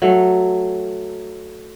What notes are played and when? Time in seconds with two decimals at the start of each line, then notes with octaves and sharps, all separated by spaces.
0.02 F#3 A3